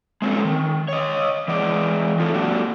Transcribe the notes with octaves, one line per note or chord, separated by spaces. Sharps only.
G#3 C4 C#4 F4 A4
D#3
C#5 D#5
E3 G#3 D5
A3 F4 A4
F#3 A#3 D4 F#4 G4